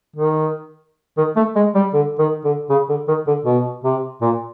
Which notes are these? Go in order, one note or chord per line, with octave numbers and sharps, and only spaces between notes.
D#3
D#3
A3
G#3
G3
D3
D#3
D3
C#3
D3
D#3
D3
B2
C3
A#2